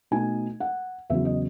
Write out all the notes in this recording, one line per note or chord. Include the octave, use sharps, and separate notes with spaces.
B2 A3 D#4 G#5
F#5
E2 C#3 F#3 E5
D#5